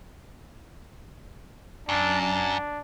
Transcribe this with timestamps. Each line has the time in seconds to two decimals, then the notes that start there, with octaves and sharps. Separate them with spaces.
1.89 F#2 D4
2.22 D4